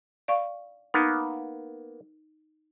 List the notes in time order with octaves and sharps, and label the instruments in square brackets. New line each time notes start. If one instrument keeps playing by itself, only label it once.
[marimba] D5 F5 C#6
[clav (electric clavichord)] A#3 B3 [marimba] D#4